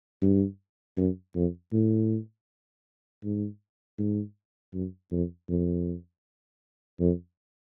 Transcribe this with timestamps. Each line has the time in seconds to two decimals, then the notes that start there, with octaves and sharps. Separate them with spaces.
0.22 G2
0.97 F#2
1.35 F2
1.73 A2
3.24 G#2
3.99 G#2
4.74 F#2
5.12 F2
5.50 F2
7.00 F2